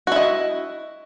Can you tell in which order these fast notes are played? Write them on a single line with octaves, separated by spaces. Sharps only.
F#4 E4 D#5